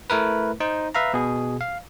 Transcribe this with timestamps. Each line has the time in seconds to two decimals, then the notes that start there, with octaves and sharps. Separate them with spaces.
0.10 A3 E4 A#4 B4
0.60 D#4 C5
0.95 B4 E5 F5 A#5
1.14 B2 G#4
1.61 F5